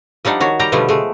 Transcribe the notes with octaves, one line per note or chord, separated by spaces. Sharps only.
F3 G3 D4 D#4 F#5
D#3 F#4 C#5
G3 G4 A#5
B2 D3 F3 G3 A3 B3
G#3 A3